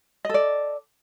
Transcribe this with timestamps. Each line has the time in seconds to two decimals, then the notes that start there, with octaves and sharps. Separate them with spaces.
0.25 D#5
0.29 A4
0.34 D5